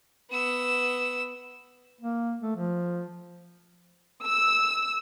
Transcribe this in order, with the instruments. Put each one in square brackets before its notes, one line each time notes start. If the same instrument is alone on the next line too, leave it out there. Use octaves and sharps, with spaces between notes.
[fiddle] B3 E6
[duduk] A#3
A3
F3
[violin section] E6